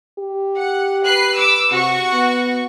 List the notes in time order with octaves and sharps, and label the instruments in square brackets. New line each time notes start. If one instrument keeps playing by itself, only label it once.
[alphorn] G4
[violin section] F#5
B4 F#6 C7
D6 E6
[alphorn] C3 [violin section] F#4 F#5 C#6
[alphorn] B3